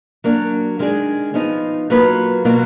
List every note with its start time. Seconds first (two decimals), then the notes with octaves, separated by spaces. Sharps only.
0.24 F#3 A#3 D4
0.79 D#3 G#3 D4 G#4
1.34 F3 B3 D#4
1.90 F#3 A#3 F4 B4
2.45 B2 F#3 A#3 F4